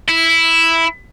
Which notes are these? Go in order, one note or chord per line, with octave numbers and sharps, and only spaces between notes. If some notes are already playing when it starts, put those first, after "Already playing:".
E4